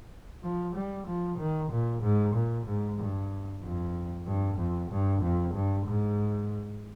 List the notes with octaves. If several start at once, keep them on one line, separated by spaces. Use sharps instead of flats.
F3
G3
F3
D#3
A#2
G#2
A#2
G#2
G2
F2
G2
F2
G2
F2
G2
G#2